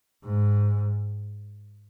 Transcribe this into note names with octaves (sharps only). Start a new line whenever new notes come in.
G#2